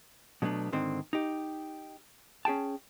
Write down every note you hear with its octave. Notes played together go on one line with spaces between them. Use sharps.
B2 F#3 A3 B3 C4 D4
G#2 D3 D#3 C4
D#4 G4
C#4 G#4 G5 A5